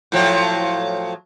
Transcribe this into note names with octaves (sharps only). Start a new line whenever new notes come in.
A2 F3 F#3